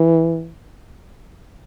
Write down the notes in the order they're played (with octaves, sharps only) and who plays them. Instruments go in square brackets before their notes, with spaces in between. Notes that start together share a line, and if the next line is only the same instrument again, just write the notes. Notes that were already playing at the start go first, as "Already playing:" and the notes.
Already playing: [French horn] E3